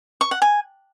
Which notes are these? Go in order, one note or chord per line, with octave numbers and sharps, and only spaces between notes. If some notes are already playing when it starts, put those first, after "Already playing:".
C#6
F#5
G#5